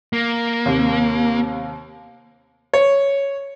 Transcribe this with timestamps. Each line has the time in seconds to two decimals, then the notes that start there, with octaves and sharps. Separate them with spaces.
0.13 A#3
0.65 D#2 C3
2.74 C#5